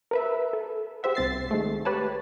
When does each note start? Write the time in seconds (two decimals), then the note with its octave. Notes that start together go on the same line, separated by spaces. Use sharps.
0.11 A#4 B4 E5
0.53 A4
1.03 G4 G#4 C5 E5 F#5
1.15 C2 C4 A6 C7
1.51 D#3 G#3 A3
1.85 G4 B4 C#5 A5